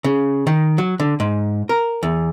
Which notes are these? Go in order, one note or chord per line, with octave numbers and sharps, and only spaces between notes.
C#3
D#3
F#3
D3
G#2
A#4
E2